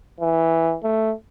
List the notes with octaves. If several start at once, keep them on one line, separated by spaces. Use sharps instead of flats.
E3
A3